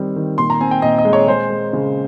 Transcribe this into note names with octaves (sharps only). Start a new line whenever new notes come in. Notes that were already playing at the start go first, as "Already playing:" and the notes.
Already playing: D#3 G3 C4
D#3
A#2 C6
A#5
C4 G#5
G5
A#2 D#5
D#5
G#3
C#5
G#3 C5
G#3
C#3